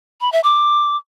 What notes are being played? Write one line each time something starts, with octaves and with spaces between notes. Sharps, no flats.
B5
E5
D6